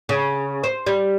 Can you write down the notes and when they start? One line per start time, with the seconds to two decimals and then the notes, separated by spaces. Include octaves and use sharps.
0.09 C#3
0.64 C5
0.87 G3